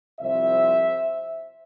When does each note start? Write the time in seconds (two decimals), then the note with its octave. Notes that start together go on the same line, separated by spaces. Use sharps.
0.20 C2 C3 F3 C5 E5